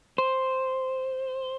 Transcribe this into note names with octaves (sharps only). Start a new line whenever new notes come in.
C5